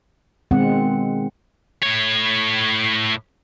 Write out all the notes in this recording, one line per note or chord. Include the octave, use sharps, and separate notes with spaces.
B2 D#3 G#3 C4 F#5
A2 C#5